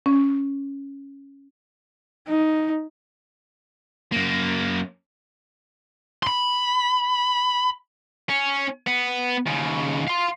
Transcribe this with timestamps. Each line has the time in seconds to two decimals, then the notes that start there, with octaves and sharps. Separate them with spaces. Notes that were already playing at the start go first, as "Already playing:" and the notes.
0.06 C#4
2.27 D#4
4.12 F#2 A#3
6.23 B5 C6
8.29 C#4
8.87 B3
9.46 D#2 C#3
10.07 F5 C6